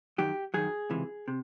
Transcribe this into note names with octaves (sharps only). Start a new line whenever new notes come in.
F#2 D#3 F#3 G4
F#2 D#3 F#3 G#4
C#2 C3 E3
C3